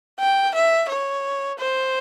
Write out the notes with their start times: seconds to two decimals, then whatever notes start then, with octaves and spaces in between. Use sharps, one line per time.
0.19 G5
0.54 E5
0.89 C#5
1.59 C5